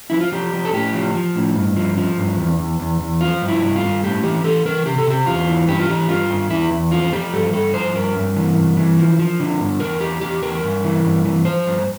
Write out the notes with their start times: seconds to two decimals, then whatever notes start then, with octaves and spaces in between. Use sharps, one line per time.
0.10 F3 E4
0.21 F4
0.32 F3 G4
0.53 F3
0.65 A4
0.73 A2 G4
0.94 F3
1.15 F3
1.36 A2
1.55 G2
1.77 F3
1.97 F3
2.18 G2
2.38 E2
2.59 E2
2.79 E2
3.00 E2
3.21 F3 F4
3.42 G2
3.48 E4
3.62 G2
3.76 F4
3.83 G2
4.04 A2 G4
4.23 E3 G4
4.44 E3 A4
4.65 E3 A#4
4.86 C3 G4
4.98 A4
5.07 C3 G4
5.26 E2 F4
5.48 E3
5.68 G2 G4
5.79 F4
5.89 E3 G4
6.09 G2 F4
6.30 G2
6.50 E2 E4
6.71 E2
6.91 F3 F4
7.13 F3 G4
7.33 G2 A4
7.53 G2 A4
7.74 F3 C5
7.95 G2 A#4
8.16 G2
8.36 E3
8.56 G2
8.77 E3
8.97 F3
9.19 F3
9.40 D3
9.60 G2
9.80 E2 A#4
10.00 E2 G4
10.21 E2 G4
10.42 E2 A#4
10.63 G2
10.84 E3
11.04 G2
11.25 E3
11.45 F3 C5
11.67 G2